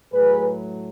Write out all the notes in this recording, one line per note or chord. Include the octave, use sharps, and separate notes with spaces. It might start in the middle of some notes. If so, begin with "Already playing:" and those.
A2 F#3 A3 G#4 B4